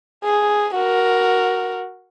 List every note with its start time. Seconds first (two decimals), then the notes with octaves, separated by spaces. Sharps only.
0.24 G#4
0.75 F#4 A#4